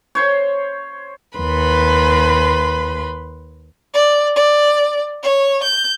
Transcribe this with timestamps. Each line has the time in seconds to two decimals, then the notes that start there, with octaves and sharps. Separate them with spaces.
0.15 C5 C#5
1.38 D#2 B4 B5 C6
3.94 D5
4.36 D5
5.23 C#5
5.64 G6